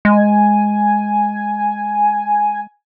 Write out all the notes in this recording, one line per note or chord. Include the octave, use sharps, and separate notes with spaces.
G#3 G#5